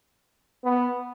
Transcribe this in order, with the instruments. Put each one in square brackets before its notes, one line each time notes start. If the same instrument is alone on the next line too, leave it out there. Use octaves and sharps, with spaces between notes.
[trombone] B3